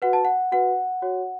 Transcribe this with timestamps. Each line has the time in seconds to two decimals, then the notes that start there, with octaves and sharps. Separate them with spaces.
0.02 F#4 B4 F#5
0.13 A5
0.25 F#5
0.52 F#4 B4 F#5
1.02 F#4 C#5